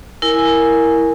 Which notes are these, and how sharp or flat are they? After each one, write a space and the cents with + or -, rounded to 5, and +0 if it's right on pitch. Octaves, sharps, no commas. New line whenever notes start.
E4 +0 A#4 +0 G#5 +0